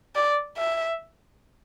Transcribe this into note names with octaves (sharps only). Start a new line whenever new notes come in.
D5
E5